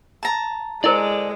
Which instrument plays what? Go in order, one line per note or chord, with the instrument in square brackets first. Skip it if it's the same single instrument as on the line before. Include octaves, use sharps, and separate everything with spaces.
[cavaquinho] A5 A#5
[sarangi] G#3 [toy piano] E4 A#4 C5 [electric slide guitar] A4 D5